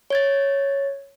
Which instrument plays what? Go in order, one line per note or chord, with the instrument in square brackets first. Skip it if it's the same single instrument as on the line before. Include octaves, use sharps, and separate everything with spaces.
[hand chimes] C#5 G#6 A6